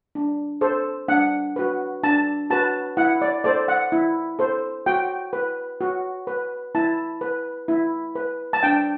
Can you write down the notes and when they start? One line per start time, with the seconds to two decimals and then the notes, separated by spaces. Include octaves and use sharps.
0.15 D4
0.61 A4 C5
1.08 D4 F#5
1.56 F#4 B4
2.03 D4 A5
2.50 F#4 B4 A5
2.97 E4 F#5
3.22 D5
3.44 A4 C5 D5
3.68 F#5
3.92 E4
4.39 A4 C5
4.86 F#4 G5
5.33 B4
5.81 F#4
6.27 B4
6.75 E4 A5
7.21 B4
7.68 E4
8.15 B4
8.53 A5
8.63 D4 G5